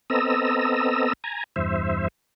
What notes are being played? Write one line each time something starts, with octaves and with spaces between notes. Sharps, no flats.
B3 C4 A4 D#5 A#5 E6
G#5 A#5
E2 G2 C5 E5